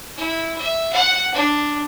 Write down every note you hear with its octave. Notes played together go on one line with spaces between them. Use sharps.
E4
E5
F#5
D4